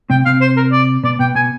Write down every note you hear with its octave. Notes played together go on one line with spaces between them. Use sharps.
C3 C4 G5
C3 C4 F5
C5
A#4
D5
B2 B3 D5
B2 B3 G5
B2 B3 G#5